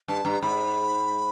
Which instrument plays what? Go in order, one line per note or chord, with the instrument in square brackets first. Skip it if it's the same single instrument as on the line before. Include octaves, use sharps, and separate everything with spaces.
[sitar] G2 [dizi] A5
[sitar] G2 [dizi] A#5
[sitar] G#2 [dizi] B5